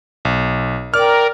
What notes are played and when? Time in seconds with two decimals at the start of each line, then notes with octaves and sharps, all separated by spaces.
0.25 B1
0.94 A#4 D5 G5 F6